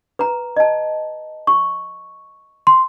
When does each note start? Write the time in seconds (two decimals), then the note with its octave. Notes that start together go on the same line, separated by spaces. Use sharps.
0.19 B4 A#5
0.57 D#5 A5
1.47 C#6
2.67 C6